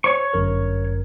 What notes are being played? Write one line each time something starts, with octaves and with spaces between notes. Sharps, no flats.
C5 C#5 C#6
G1 F#2 A#4